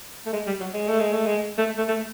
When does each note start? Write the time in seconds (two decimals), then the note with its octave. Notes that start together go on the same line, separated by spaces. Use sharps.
0.26 A3
0.33 G#3
0.47 G3
0.60 F#3
0.74 G#3
0.88 A3
1.00 G#3
1.13 A3
1.26 G#3
1.58 A3
1.78 A3
1.88 A3